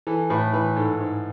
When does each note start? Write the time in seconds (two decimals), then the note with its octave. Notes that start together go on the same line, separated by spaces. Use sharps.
0.07 E3 A4
0.30 A2 B4
0.53 E3 B4
0.76 G#2 A4
1.00 G#2